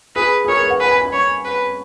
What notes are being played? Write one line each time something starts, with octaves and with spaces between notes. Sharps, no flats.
G#4 B4
G#4
A#4 C#5
B4
F#5
B4 G#5
G#5
B5
C#5 C#6
B4